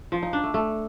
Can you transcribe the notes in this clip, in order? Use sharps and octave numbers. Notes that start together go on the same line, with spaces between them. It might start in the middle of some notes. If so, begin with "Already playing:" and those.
F3
D#4
D4
A3
A3